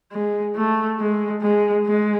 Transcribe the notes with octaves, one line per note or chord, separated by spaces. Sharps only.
G#3
A3
G#3
G#3
G#3